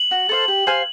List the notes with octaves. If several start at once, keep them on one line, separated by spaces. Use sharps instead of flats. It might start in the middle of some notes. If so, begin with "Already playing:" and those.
Already playing: F#7
F#4
A4 C5 F5
G4
C5 F5 G#5